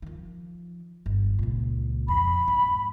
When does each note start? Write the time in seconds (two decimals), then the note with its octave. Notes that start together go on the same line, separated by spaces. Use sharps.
0.02 D#3 F3
1.06 G1
1.39 C#2 A#2
2.08 F2 B5
2.48 G#2